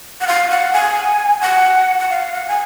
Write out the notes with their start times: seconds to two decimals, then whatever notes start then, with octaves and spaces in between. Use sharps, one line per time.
0.21 F#5
0.27 F5
0.50 F#5
0.73 G#5
1.41 F#5
1.99 F#5
2.10 F5
2.33 F#5
2.48 G#5